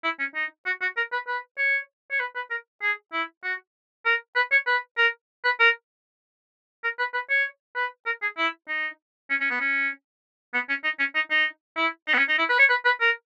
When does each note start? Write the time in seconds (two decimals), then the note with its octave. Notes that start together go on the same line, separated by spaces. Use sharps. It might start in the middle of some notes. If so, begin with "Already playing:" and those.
0.04 E4
0.19 C#4
0.35 D#4
0.66 F#4
0.81 F#4
0.97 A#4
1.13 B4
1.28 B4
1.58 C#5
2.11 C#5
2.20 B4
2.36 B4
2.51 A#4
2.82 G#4
3.13 E4
3.44 F#4
4.05 A#4
4.36 B4
4.52 C#5
4.67 B4
4.98 A#4
5.45 B4
5.60 A#4
6.84 A#4
6.99 B4
7.14 B4
7.30 C#5
7.76 B4
8.06 A#4
8.22 G#4
8.38 E4
8.68 D#4
9.30 C#4
9.41 C#4
9.51 B3
9.61 C#4
10.54 B3
10.69 C#4
10.84 D#4
11.00 C#4
11.15 D#4
11.31 D#4
11.77 E4
12.08 D#4
12.14 B3
12.18 C#4
12.29 D#4
12.39 E4
12.49 B4
12.59 C#5
12.70 B4
12.85 B4
13.01 A#4